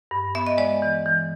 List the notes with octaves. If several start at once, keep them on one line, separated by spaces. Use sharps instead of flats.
G2
B3 E5
D#5
G#3 D5
E3
E3